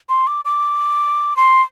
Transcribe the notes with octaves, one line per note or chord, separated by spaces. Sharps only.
C6
D6
D6
C6